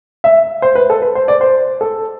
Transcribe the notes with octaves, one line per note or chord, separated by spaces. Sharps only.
E5
C5
B4
A4
B4
C5
D5
C5
A4